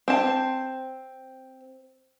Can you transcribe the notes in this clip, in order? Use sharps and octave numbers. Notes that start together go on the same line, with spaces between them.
C4 A5